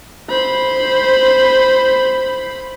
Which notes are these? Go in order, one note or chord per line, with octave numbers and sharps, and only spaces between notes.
C5 B5